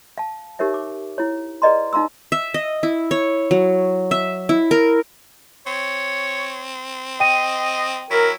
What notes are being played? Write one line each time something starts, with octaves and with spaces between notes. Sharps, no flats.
F5 A5
D#4 G4 A#4 C#5 E5
D6
E4 C#5
G#4 B4 D5 D#5 A#5 C6
D#4 F5 A#5 C6 E6
E5
D#5
E4
C#5
F#3
E5
E4
A#4
C4 C#5
D#5 G5 D#7
F#3 E4 A#4